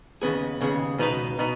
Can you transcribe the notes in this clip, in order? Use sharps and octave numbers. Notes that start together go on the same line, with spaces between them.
D#2 C#3 B3 G#4
D#2 C#3 B3 G#4
C#2 B2 B3 D#4 B4
B2 B3 D#4